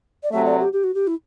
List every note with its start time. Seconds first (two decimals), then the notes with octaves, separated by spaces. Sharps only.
0.23 D5
0.31 C3 F#3 A3 E5
0.45 D5
0.60 G4
0.73 G4
0.83 F#4
0.94 G4
1.07 E4